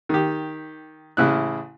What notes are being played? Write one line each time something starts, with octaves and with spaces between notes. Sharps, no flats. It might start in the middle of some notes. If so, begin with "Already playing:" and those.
D#3 G4
A1 C#3 E4 F#6